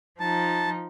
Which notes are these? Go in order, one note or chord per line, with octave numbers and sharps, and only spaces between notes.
F3 D#4 A5